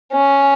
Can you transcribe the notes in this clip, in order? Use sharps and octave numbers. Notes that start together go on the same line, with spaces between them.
C#4